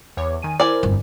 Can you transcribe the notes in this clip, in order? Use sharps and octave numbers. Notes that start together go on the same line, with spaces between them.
E2 C#5 D6
D#3 G#5 D#7
E4 A#4 C5 D5 G#5
G1 F2